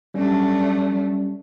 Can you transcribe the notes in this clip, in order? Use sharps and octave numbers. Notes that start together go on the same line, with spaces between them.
F#3 G3 A3 C#4 D4